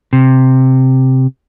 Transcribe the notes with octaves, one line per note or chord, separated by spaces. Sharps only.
C3